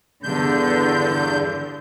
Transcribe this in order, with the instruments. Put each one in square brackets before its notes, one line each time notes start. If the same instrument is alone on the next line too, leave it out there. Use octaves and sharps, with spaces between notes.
[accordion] E2 G2 G6 [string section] D3